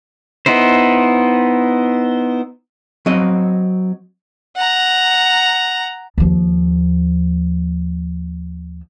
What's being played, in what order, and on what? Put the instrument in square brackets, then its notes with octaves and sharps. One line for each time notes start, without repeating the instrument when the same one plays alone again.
[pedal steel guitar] B3 D#4 E4 C5
[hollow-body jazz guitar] F#3 C4 D#5
[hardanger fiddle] F#5 A#5
[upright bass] D#2 F3